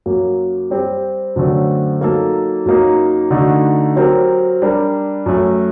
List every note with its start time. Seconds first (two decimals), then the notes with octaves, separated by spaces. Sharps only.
0.06 F#2 F#3 A#3
0.70 G3 C4 G4
1.36 F#2 D3 F#3 A3 C4
2.01 F#3 A#3 D#4 A4
2.66 F#2 F#3 A#3 D#4
3.31 D3 A3 D#4 F#4
3.96 F#3 C4 G4 A#4
4.62 G3 D4 G4 A#4
5.26 F#2 F#3 A3